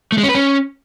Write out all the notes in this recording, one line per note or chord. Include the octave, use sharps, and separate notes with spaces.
A3
G#3
C#4
B4
C#4